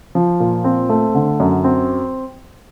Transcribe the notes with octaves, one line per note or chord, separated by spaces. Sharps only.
F3
A#2
C4
A3
D3
F#2
C4